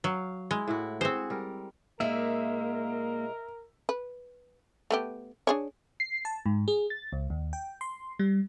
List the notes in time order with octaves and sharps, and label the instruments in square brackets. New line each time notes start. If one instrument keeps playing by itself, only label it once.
[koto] F#3 [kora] F5
[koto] G#3 [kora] E4
[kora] A2 E4 F#4
[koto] C4 C5 [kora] F#4 G#4
[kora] G3 A#4
[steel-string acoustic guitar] A#2 G#3 D#4 [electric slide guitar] A#3 [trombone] A#4 [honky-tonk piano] E5
[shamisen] B4
A3 B3 G4
D4 G#4 C#5
[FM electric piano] C7
A5
G#2
G#4
A6
C#2
D#2
G5
C6
G3